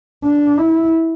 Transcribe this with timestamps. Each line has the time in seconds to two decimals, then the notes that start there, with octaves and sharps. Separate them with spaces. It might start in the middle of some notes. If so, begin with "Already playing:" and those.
0.24 D4
0.57 E4